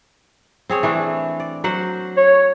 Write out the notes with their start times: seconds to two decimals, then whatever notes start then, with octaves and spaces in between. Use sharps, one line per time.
0.70 C4 G#4 C#5
0.83 E3 A3 D4
1.40 D5
1.64 F#3 C5 F#5
2.17 C#5